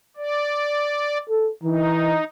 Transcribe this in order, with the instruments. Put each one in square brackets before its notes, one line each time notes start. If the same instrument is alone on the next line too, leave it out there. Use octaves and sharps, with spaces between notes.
[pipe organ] D5
[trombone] A4
[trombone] E3 [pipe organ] D#4